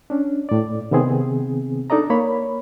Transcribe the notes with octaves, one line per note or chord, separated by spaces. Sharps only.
C#4 D4
A2 D5
C3 D#3 B3 C4 G#4
D4 D#4 A4 D5 D#5 A#5
A#3 C#5 B5